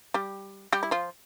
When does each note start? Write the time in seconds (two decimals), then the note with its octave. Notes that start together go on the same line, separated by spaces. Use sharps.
0.14 G3 G4
0.73 G3 G4
0.83 E4
0.91 F3 F4